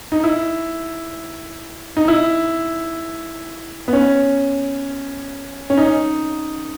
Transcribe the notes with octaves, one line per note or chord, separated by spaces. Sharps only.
D#4
E4
D#4
E4
B3
C#4
C#4
D#4